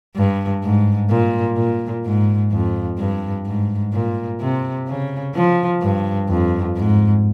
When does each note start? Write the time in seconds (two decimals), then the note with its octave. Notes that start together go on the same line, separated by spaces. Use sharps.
0.16 G2
0.63 G#2
1.10 A#2
1.57 A#2
2.05 G#2
2.52 F2
2.99 G2
3.47 G#2
3.93 A#2
4.41 C3
4.88 C#3
5.35 F3
5.82 G2
6.29 F2
6.76 G#2